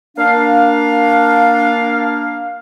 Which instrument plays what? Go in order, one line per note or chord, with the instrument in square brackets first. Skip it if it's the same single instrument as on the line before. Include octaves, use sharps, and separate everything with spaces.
[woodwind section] A#3 D4 F5